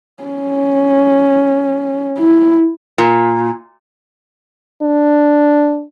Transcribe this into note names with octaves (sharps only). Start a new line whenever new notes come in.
C#4
E4
A#2
D4